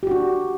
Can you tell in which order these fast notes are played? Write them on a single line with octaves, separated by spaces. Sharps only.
G4 F#4 D4